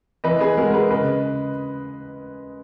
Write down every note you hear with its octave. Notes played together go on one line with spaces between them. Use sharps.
E3 B4 D#5
G#4 B4
G#3 F#4 A#4
G#4 B4
C#3 B4 D#5